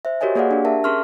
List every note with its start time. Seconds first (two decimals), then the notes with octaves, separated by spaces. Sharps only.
0.05 C5 E5
0.21 F#4 G4 A#4 C#5 D#5 G#5
0.35 A#3 G#4 D5 F5 F#5
0.51 D4 G4
0.65 A#4 E5 A5
0.84 C#4 G#4 A#4 C6 C#6 F6